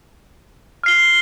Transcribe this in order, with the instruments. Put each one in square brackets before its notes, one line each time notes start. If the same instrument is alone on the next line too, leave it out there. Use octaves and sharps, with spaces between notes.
[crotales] F6 C7 G7